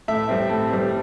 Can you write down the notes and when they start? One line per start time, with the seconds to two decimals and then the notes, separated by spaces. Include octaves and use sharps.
0.08 A2 E5
0.29 G3 C4
0.49 A2
0.70 G3 C4